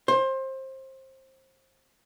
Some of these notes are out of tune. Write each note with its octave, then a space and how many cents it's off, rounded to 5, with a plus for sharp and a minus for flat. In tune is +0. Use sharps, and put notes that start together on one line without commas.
C5 +25